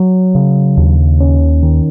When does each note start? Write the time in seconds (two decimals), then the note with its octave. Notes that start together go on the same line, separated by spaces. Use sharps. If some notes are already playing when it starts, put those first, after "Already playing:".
Already playing: F#3
0.35 C#3
0.77 D#2
1.20 C#4
1.62 D#3